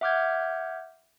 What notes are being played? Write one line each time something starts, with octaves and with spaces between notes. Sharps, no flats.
E5 F#5 D6 F6 G6 G#6